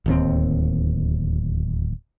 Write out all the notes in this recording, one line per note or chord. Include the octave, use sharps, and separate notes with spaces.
D1 D#2 C4